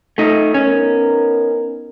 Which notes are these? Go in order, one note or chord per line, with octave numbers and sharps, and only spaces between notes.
A3 D#4
B3 C#4 D#4 A#4